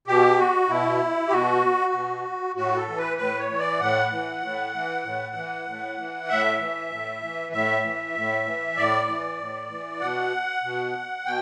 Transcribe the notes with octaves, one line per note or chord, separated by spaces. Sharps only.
B2 G4
F#4
B2 E4
G4
B2 F#4
B2
A2 F#4
A4
E3
B4
A2 B4
C#5
E3
D5
A2 F#5
E3
A2
E3
A2
E3
A2
E3
A2 E5
E3
A2
E3
A2 E5
E3
A2
E3
A2 D5
E3
A2
E3
B2 F#5
B2
B2 G5